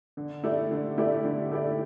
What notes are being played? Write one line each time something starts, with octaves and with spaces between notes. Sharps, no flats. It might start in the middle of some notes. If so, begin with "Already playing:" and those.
D3
A3 E4 G4 D5
D3
A3 E4 G4 D5
D3
A3 E4 G4 D5